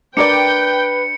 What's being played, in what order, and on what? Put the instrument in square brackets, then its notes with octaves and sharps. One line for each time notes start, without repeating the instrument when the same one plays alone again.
[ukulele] D4 A#4 D5 [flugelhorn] B4 [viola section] G5 [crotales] C#7